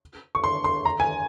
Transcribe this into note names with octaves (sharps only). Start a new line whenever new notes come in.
C#6
C6
C6
A#5
G#5